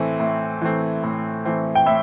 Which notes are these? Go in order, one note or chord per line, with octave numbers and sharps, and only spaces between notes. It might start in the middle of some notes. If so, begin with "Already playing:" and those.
Already playing: A2 E3 A3 C4
A2
E3 A3 C4
A2
E3 A3 C4
G5
A2 E5